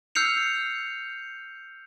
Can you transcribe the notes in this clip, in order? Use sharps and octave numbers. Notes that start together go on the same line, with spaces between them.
E6 F6 G6 C7 C#7 F7